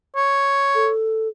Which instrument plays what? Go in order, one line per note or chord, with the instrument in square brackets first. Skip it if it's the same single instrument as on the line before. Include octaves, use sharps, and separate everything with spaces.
[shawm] C#5
[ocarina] A4